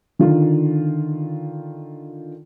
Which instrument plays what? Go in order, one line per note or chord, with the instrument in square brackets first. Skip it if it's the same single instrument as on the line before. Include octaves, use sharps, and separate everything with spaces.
[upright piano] D3 D#3 F4